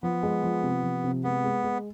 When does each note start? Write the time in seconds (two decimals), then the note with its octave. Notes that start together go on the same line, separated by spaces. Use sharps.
0.03 F3 B3
0.23 G#3
0.43 F3
0.63 C3
0.83 F3
1.04 C3
1.24 G#3 B3
1.44 G#3
1.64 G#3